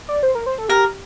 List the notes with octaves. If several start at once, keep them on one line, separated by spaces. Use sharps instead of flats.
D5
C5
A#4
C5
A4
G4 A#4